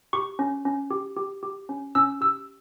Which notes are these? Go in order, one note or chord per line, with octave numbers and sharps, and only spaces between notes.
G4 C#6
C#4
C#4
G4
G4
G4
C#4
C#4 E6
G4 E6